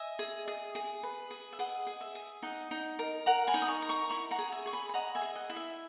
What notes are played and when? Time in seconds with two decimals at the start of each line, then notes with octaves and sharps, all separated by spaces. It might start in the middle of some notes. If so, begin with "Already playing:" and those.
Already playing: D#5 E5 G#5
0.19 G#4
0.48 G#4
0.75 G#4
1.03 B4
1.31 G#4
1.53 E5
1.59 G#4 D#5 F#5
1.87 G#4
2.01 E5
2.15 G#4
2.42 D#4 D#5 F#5
2.71 D#4
2.99 A#4
3.26 A#4 F#5 A#5
3.47 G#5 B5
3.54 D#4
3.62 D#6
3.68 A#5 C#6
3.82 A#4
3.89 A#5 C#6
4.09 E4 A#5 C#6
4.31 F#5 A#5
4.39 G#4
4.52 E5 G#5
4.66 G#4 C#6
4.72 G#5 B5
4.89 B5
4.94 D#5 F#5 A#5
5.15 E5 G#5
5.22 G#4
5.35 D#5 F#5
5.50 E4
5.56 E5